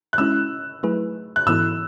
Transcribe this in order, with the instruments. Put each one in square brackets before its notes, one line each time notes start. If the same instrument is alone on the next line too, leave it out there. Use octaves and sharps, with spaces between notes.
[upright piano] F#6
[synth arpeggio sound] G#3 C#4 E4 [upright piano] E6
[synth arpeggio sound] F#3 A3 E4 G#4 B4
[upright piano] F#6
[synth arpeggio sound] G#2 E3 B3 E4 A4 [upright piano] E6